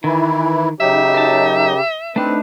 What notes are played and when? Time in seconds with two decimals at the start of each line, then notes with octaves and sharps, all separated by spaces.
0.04 D#3 E3 E4
0.80 C#3 F#3 D#4 G4 E5
1.14 A#4 A5
2.16 A3 C4 D4 D#4 B4